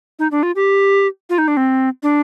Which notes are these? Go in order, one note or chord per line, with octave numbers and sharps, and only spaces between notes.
D#4
D4
F4
G4
F4
D#4
D4
C4
D4